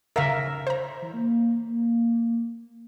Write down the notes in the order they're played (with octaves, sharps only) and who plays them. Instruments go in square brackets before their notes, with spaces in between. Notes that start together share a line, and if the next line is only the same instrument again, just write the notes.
[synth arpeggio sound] C#3 F5 A#6 [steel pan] A#4 E5
[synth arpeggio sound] C5 A#5
[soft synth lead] E3
A#3